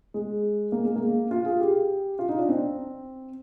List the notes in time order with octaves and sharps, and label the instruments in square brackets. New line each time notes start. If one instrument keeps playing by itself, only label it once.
[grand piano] G#3
A#3
G#3
A#3
F4
G#4
G4
F4
D#4
D4
C4